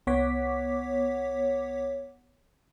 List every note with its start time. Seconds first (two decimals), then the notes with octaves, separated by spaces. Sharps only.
0.07 C2 B3 C#5 F#5 D6 B6